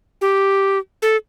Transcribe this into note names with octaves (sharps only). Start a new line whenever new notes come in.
G4
A4